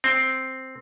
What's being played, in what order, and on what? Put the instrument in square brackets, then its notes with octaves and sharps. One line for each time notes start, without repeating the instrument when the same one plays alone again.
[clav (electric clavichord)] C4